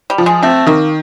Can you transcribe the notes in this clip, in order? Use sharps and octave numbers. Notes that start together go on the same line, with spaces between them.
G3
F3
G#3
A3 C4
D#3 A#3